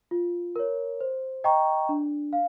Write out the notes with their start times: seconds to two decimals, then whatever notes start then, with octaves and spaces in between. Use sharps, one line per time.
0.11 F4
0.56 A#4 C#5
1.01 C5
1.44 D#5 G5 A#5 C#6
1.89 D4
2.33 F5